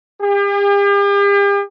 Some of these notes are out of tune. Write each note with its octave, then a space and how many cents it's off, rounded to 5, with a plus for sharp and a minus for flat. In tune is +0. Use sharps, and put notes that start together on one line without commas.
G4 +45